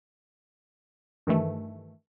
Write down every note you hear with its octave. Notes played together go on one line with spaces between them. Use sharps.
G2 D#3 E3 A3